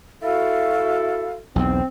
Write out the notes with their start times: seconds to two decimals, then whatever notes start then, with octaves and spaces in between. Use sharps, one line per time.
0.23 E4 F#4 A4 F5
1.56 B1 E2 C4